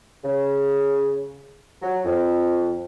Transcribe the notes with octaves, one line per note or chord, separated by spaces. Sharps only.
C#3
F#3
F2